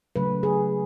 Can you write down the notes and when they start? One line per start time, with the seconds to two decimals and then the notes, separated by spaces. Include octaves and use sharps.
0.16 C#3 F#3 A3 B4
0.43 G#4